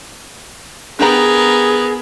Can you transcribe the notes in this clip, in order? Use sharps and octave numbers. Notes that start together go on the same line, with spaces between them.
B3 D4 G4 G#4 A#4 A#5